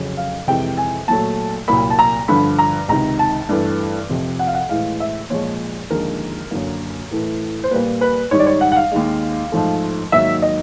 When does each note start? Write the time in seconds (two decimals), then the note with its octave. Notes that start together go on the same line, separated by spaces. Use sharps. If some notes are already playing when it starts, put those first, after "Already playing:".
Already playing: F2 C#3 F#3
0.17 F5
0.47 F2 C3 E3 G#3 G5
0.77 G#5
1.08 A#2 F#3 A3 A5
1.68 C2 A#2 F#3 A#3 B5
1.90 A5
1.99 A#5
2.28 G2 D3 F3 B5
2.59 A#5
2.88 C#2 C3 D#3 A#5
3.19 A5
3.49 G2 E3 A3
4.09 F2 C3 F3
4.39 F#5
4.47 F5
4.54 F#5
4.69 A2 E3 G#3 F5
5.00 E5
5.30 A#2 F3 G#3 C#5
5.90 D#2 D3 F3 G#3 A#4
6.51 F#2 D3 F#3 A#3
7.11 A2 E3 A3
7.64 C5
7.71 A#2 G3 A#3 B4
8.01 B4
8.31 G#2 D#3 G3 C#5
8.39 D5
8.46 C#5
8.61 F#5
8.72 F#5
8.76 F5
8.92 D#2 D#3 G#3
9.52 G#2 F3 A3
10.12 G#2 D#3 F#3 A#3 E5
10.42 D#5